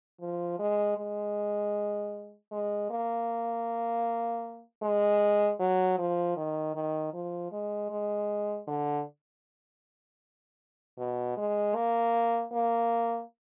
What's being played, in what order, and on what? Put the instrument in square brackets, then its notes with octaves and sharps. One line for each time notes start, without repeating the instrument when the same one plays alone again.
[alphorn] F3
G#3
G#3
G#3
A#3
G#3
F#3
F3
D#3
D#3
F3
G#3
G#3
D3
B2
G#3
A#3
A#3